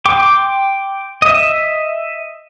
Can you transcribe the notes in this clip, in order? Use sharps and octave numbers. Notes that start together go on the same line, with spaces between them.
G5 C6 D6
D#5 E5